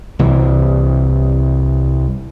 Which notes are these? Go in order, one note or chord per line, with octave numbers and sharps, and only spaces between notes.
C2 E3